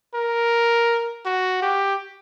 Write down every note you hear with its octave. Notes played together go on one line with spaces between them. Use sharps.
A#4
F#4
G4